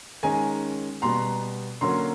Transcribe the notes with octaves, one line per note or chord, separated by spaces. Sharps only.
D#3 G#3 C#4 G#5 A#5
B2 G3 B3 A#5 C6
D3 F#3 A#3 C#4 A#5 C6